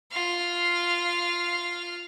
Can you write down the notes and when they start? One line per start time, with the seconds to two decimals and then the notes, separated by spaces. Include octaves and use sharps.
0.12 F4 F5